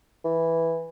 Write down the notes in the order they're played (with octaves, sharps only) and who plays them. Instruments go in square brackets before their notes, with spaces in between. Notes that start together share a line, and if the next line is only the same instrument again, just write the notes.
[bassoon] E3